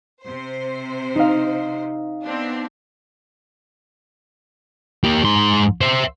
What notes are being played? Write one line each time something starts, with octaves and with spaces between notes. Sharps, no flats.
C3 C5
D#4 F5
B3 C4 D4
A#3 G4
G#2 C6
C5 E5